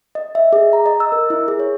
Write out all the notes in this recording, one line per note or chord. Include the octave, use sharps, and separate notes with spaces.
D#5
E5
G#4
A#5
D#5
E6
A#4
E4
G#4
C#5